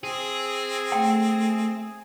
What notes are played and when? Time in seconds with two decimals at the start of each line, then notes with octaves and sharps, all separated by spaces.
0.04 C4 G#4
0.92 A3 G5